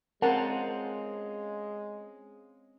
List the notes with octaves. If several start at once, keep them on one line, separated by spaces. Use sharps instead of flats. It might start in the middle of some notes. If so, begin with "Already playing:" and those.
G#3 C4 C#4 F4 A#4 F#5 A5